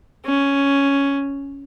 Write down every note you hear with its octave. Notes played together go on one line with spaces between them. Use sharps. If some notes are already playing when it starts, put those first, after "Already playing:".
C#4